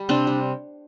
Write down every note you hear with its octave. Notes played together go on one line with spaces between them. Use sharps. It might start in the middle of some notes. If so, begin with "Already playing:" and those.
Already playing: G3
C3 C4 D4
G3